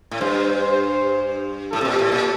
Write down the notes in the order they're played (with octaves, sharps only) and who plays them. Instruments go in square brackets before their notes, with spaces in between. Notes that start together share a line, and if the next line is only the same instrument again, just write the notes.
[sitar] A2
[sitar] G2 [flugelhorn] C5
[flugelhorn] C5
[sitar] A2 [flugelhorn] A4
[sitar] C3
A#2
A2
A#2